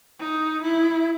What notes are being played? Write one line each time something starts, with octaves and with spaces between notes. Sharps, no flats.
D#4
E4